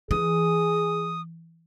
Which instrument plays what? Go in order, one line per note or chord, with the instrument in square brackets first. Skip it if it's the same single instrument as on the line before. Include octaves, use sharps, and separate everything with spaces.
[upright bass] E3 [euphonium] G#4 [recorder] D#6